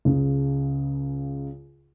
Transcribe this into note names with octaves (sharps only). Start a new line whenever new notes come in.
C#2 C#3